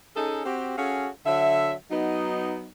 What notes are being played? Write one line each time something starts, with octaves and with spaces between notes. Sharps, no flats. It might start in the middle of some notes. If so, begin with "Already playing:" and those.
C#4 D#4 G#4 A4
C4 F#4 G4
C#4 F#4 G#4 A4 F5
D3 F#3 E5
F#3 B3 D#4